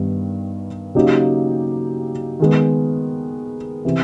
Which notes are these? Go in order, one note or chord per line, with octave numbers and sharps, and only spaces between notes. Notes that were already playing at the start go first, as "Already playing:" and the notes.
Already playing: G2 D#3 G3 B3
C#3 F#3 A#3 D#4 G4
D#3 G#3 B3
C3 E3